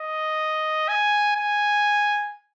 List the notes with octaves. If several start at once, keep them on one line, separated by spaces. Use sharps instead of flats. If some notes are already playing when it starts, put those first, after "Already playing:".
Already playing: D#5
G#5
G#5